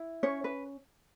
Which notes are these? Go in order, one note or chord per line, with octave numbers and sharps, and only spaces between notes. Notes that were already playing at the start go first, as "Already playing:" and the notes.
Already playing: E4
C#4 C#5
B4